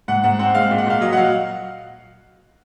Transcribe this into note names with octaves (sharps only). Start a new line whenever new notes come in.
G#2 F#5
G#2 F#5
C4 F#5
G#3 F5
A#2
F#5
A#2 F5
F#3 D#5
F#5
F#3 F5